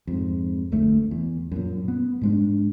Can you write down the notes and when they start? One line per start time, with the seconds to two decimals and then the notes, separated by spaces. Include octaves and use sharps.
0.07 F2 G#2
0.72 G1 D2 A3
1.11 E2
1.52 F#2 A#2
1.88 B3
2.21 G#2 G#3 D4